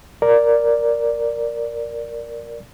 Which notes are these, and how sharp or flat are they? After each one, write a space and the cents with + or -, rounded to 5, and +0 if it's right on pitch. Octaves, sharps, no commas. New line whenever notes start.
A#4 +0 D5 -5